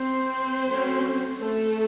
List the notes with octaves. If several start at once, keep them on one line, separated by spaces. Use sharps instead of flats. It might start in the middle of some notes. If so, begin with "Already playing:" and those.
Already playing: C4 C5
F#3 A3 C#4
A3 A4